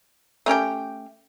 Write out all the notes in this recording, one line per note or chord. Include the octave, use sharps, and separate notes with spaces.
A3 C#4 G4 G5